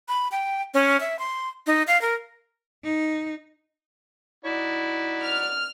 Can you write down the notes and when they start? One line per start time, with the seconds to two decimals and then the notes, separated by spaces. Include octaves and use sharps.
0.08 B5
0.32 G5
0.74 C#4
1.00 E5
1.19 C6
1.67 D#4
1.87 F5
2.01 A#4
2.84 D#4
4.45 D#4 E4 F#4 D5
5.24 F6